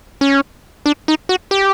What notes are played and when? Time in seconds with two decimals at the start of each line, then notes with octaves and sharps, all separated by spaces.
0.21 C#4
0.86 D4
1.08 D#4
1.29 F#4
1.51 G4